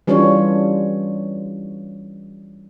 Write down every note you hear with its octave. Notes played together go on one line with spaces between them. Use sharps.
E3 G3 C#4 D4 F4 C#5